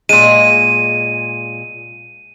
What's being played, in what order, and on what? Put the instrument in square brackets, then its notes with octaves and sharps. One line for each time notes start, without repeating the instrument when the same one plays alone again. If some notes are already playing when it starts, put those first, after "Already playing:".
[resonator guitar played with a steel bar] A#2 G#3 [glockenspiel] D#7